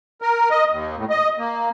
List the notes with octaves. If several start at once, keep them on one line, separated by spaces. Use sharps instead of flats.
A#4
D#5
D#2
A2
D#5
A#3